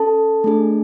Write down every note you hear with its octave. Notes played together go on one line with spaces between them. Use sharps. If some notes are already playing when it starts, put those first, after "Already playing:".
Already playing: C#4 A4 A5
A3 D4 G#4